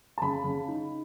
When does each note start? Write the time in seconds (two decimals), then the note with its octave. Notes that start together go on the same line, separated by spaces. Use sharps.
0.18 A5
0.22 C#3 B5
0.44 C#3
0.68 D#4